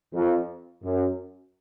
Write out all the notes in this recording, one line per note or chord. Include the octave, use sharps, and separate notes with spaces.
F2
F#2